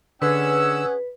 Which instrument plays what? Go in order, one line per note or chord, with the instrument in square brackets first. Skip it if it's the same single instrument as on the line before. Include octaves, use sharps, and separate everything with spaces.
[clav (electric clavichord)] D3 [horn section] C#4 G#4 F#5 [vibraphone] B4 [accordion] E6